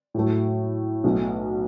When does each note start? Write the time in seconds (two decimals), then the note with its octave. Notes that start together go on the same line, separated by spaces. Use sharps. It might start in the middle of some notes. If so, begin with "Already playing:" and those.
0.14 A2 F#3 A3
1.04 B1 B2 A3